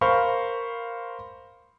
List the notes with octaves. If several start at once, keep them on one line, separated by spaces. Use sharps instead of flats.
A#4 C5 F5 B5 C#6